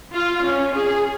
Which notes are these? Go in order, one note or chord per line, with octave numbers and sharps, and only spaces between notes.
F4
C#4
G#4